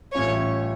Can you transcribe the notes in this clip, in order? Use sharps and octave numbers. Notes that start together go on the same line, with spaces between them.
A1 A2 G3 C#4 F4 C#5